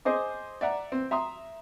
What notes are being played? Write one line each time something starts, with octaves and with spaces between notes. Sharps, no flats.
G#4 C5 D#5 D6
D5 E5 F#5 A#5
C4
E5 A#5 C6 D#6